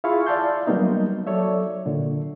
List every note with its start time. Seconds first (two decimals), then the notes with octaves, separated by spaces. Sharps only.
0.04 E4 F4 G#4 F5 B5 C#6
0.27 D5 E5 F5 A5 C6 G6
0.67 F#3 G3 A#3 B3 D#4
1.27 F#3 A4 C#5 D5 E5
1.86 A#2 D3